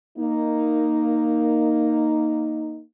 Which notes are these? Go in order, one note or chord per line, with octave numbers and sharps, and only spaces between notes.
A#3 D#4